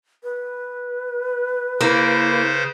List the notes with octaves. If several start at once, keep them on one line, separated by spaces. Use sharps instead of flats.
B4
C#3 A#3 E4 C5